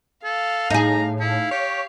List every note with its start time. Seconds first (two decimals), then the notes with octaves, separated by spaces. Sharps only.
0.24 A4 F5
0.70 A2 D#4 G#4 A#5
1.20 E4 F5
1.51 G4 C#5